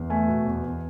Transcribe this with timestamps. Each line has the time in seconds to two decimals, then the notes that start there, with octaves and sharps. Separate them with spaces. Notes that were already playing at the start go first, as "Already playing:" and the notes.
Already playing: E2
0.10 A3 G#5
0.28 B2
0.46 E2
0.64 E2